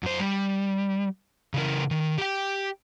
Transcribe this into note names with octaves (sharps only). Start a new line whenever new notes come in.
F#2 C5
G3
C#3 E3 A#4
D#3
G4 G5